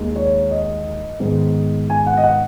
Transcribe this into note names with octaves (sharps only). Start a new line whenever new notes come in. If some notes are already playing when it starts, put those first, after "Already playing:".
Already playing: D#2 D#3 G#3
C#5
D#5
G#2 D#3 G#3 B3
G#5
F#5
D#5
F#5